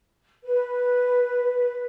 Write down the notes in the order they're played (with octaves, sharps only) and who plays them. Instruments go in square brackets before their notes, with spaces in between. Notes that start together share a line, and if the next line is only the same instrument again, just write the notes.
[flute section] B4